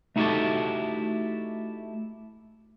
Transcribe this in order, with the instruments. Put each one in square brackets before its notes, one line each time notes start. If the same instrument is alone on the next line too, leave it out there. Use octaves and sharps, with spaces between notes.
[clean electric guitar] A3 D#4 E4 F#4 G4 A4